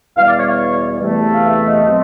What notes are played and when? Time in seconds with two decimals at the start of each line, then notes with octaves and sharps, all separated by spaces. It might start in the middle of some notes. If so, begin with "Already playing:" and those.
0.16 E2 B2 G3 F5
0.26 D5
0.37 C#5
0.48 C#5
1.01 E2 C3 E3 A3
1.33 F5
1.45 E5
1.65 D#5
1.87 B2 F#3 A3 C4